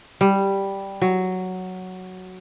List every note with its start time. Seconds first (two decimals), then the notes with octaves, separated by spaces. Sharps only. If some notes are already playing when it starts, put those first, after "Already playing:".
0.21 G3
1.01 F#3